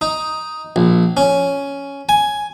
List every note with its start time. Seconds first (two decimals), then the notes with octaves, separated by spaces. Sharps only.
0.01 D#4
0.76 A#1
1.17 C#4
2.09 G#5